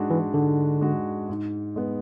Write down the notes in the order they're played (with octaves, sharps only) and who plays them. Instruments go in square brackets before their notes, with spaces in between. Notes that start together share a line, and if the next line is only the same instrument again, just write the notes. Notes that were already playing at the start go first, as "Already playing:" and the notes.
Already playing: [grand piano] G#2 G#3 D4 F#4
[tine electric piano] E3
[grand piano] G#2 [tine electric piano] D3
[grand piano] G#3 D4 F#4
G#2
G#3 B3